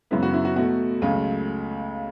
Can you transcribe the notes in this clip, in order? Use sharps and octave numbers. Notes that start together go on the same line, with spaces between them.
F#2 C#3 E3 B3 E4
F#4
E4
F#4
B2 A3 F#4
C#2 C#3 F#3 A3